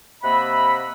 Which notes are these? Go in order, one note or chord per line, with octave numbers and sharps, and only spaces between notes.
C3 A#3 D#5 E5 F#5 B5